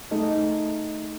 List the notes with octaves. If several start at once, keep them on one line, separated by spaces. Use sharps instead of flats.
A3 D#4 G#4 A4 D#5